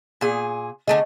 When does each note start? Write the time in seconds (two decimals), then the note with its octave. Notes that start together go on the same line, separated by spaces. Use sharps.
0.21 A#2 G#4
0.88 D3 A3 G#4 D#5